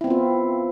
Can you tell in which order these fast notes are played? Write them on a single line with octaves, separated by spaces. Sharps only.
E4 C4 B3 F4